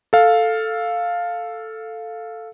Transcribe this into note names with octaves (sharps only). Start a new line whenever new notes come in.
A4 F5